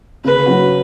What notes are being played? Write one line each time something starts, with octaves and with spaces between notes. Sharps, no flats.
C#3 B4
F#3 C#4 F#4